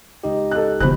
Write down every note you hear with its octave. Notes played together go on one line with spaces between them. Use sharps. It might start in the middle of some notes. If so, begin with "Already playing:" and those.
C#2 D#4 G4 D#5
A4 F#6
B2 D3 F3 C5 B5 F#6